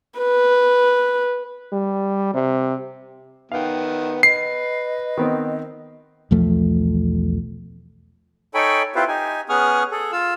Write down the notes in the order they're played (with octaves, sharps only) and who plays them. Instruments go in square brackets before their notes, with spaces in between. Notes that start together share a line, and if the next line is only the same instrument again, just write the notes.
[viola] B4
[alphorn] G3
C3
[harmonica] D#3 B3 [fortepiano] F5 G5
[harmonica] B4 [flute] D#5 [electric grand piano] C7
[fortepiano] D#3 B3 C4
[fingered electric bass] B1 E2 F3 A3
[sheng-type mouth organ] D#4 A4 C#5 G5 G#5 B5
C4 E4 F4 G4 B4 C5
D#4 G4 G#5
B3 C#4 G#4 C#6 D#6 F6
G#4 A4
F4 F5 E6